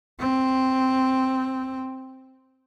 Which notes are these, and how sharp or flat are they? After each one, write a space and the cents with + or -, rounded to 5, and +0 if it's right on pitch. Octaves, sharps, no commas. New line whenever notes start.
C4 +0